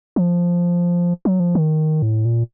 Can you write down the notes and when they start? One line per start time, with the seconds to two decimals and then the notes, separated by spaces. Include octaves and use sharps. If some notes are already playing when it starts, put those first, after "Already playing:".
0.16 F3
1.25 F#3
1.40 F3
1.55 D#3
2.02 A2
2.25 A#2